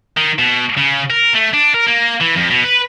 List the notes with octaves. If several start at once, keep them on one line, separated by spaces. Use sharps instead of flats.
D#3
B2
C#3
A#4
A3
D4
A#4
A#3
E3
F2
B2
B4